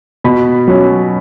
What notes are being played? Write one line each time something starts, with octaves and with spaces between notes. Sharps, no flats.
B2 B5
F#3 C#4